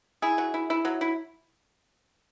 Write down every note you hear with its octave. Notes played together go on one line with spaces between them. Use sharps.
E4 G#4
F#3
E4
E4
F#3
E4